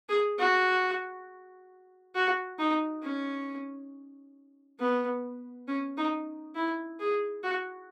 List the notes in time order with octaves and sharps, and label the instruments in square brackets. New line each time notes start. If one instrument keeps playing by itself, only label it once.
[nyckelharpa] G#4
F#4
F#4
D#4
C#4
B3
C#4
D#4
E4
G#4
F#4